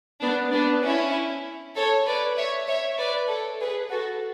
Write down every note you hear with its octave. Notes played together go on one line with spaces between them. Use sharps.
B3 D4
B3 D4
C#4 E4
A4 C#5
B4 D5
C#5 E5
C#5 E5
B4 D5
A4 C#5
G#4 B4
F#4 A4